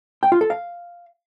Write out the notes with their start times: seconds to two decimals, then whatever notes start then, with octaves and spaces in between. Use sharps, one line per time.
0.23 G5
0.32 F4
0.41 A4
0.50 F5